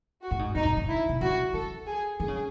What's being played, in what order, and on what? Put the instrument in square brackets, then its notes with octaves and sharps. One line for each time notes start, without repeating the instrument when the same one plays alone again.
[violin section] F#4
[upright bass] A2
G#2
[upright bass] A2 [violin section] D#4
[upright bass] C3
C#3
[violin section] E4
[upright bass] C3
[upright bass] C#3 [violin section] F#4
[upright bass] E3 [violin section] A4
[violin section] G#4
[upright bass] D#3 [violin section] G#4
[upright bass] C#3